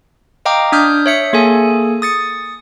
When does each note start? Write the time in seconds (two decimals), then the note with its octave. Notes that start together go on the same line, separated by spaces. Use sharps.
0.45 D#5 F5 G5 A#5 D6
0.72 D4 D#6 F6 G6
1.06 C#5 E5 C#7
1.33 A#3 G#4 A4 G#5
2.02 D#6 A6 C#7